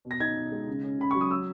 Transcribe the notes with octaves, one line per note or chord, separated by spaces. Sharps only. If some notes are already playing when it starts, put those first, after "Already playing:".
B2
A#6
D#4 G#6
B2
G#3
C#3
C#4
C#3 B5
F#3 C#6
D#6
E6